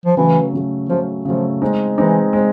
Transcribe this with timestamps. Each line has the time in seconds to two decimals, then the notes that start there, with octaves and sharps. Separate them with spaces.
0.06 F3
0.17 C#3 E3 F#3 A3
0.53 C#3 F#3 A3
0.89 C#3 F3 F#3 A3
1.25 C#3 F3 F#3 A3
1.62 G#3 C4 D#4
1.98 E3 G#3 C4 D#4
2.33 G#3 C4